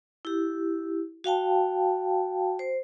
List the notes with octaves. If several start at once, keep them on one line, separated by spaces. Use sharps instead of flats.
E4 G4
F#4 F5 G5 A5
C5